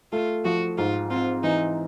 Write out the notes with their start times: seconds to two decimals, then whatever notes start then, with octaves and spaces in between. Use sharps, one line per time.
0.12 A3 F4
0.45 F3 F#4
0.78 G#2 F4
1.10 C4 F4
1.43 E3 D#4